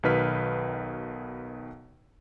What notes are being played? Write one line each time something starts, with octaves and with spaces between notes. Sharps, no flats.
B1 B2 D#3 B4 F6 B6